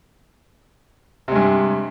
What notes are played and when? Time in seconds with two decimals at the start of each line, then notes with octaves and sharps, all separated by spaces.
1.28 C3
1.32 G#3
1.36 G2